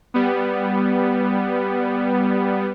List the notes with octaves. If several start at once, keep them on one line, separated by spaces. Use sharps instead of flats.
G3 B3